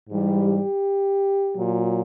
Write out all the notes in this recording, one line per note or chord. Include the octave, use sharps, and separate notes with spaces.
G#2 E3 G3
G4
A#2 F#3